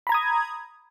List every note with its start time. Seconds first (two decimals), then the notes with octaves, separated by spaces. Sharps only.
0.07 B5
0.09 A#5
0.12 G#6
0.14 D#6